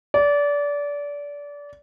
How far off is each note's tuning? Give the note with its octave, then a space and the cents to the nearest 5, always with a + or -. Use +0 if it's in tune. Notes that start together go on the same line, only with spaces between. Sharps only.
D5 -25